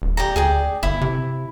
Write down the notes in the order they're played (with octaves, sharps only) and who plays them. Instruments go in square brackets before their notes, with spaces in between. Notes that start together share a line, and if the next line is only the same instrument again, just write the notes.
[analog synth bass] D#1
[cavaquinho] G4 D5 A#5
[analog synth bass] D2 [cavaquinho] G#4 D5 G5
[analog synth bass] G1 [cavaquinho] E4
[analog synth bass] C3